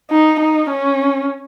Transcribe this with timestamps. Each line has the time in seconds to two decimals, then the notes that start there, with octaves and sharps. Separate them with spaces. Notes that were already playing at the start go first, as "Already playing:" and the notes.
0.10 D#4
0.40 D#4
0.70 C#4